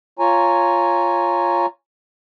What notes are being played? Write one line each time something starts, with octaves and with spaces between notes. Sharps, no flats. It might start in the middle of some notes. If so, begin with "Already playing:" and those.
F4 C#5 G#5 A#5